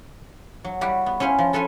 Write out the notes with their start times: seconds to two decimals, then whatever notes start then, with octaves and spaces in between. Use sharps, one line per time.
0.64 F#3
0.81 G3 E4 F#4
1.06 B3
1.20 C#4 E4 C5 C#5 F5
1.39 F3
1.53 F4 A4 B4 C#5 G#5